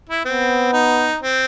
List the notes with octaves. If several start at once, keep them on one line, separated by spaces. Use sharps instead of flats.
E4
B3 C4
D#4
C4